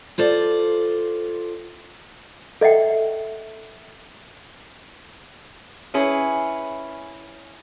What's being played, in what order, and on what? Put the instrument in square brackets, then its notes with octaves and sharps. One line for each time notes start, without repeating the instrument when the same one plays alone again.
[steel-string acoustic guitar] F4 A4 C5 D5
[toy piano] A4 D#5 E5 F#5 G5
[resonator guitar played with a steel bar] C#4 E4 G#4 B4